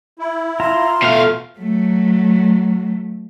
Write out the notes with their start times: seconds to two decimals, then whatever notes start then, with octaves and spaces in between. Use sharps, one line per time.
0.19 E4
0.60 F4 E5 A#5 C6
1.02 B2 A3 F5
1.59 F#3 A3